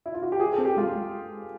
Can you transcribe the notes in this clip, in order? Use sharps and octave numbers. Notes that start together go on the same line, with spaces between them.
E4
F4
F#4
G4
F4 G#4
A4
C4
G4
G#3 F4
G#3